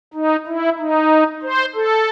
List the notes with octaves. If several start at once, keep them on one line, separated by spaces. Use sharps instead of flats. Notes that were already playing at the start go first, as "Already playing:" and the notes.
D#4
E4
D#4
C5
A4